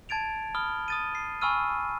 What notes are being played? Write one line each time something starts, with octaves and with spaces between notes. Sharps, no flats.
A5 G#6 A6 D7 F7
B5 D#6 F6 G7
D#6 A6 D#7
C7
G#5 B5 C#6 E6 F6 D#7